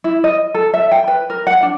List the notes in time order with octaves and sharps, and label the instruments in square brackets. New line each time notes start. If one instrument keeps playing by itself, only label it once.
[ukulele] E4
D#5
A4
E5
G5
B4
A#4
F#5
D4